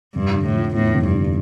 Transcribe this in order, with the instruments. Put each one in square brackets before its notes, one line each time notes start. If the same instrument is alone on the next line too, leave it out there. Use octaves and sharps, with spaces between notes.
[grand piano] F1 [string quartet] G2
[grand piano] D3
[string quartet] A2
[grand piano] F3
[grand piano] E2 [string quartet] A2
[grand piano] F1
[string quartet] G2
[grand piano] D3